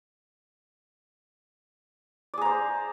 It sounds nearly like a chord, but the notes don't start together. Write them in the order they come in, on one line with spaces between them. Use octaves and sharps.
D5 G#4 A#5 C5